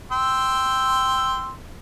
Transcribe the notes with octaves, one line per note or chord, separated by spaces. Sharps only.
G5 C6 E6